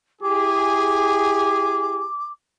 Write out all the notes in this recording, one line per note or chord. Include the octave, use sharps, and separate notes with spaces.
E4 G4 G#4 D6